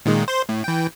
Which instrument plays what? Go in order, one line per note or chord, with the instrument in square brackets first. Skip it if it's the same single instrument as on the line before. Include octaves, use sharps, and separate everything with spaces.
[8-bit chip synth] A#2 D#3 G#3
C5 C6
A2
E3 G5